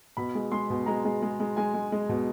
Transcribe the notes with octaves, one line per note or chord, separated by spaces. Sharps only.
B2 B5
G#3
G#3 C6
B2
G#3 A#5
G#3
G#3
G#3
G#3 G#5
G#3
G#3
B2